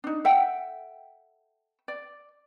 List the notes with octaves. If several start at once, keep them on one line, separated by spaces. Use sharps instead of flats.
D4 D#4
A4 E5 F#5 G5
D5